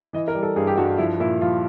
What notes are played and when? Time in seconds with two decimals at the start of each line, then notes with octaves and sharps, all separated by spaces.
0.13 E3 D#5
0.28 A#4
0.35 G3
0.43 A4
0.56 G2 G#4
0.67 G4
0.77 G2 F#4
0.98 F3 E4
1.20 A#2 E4
1.41 F3 F4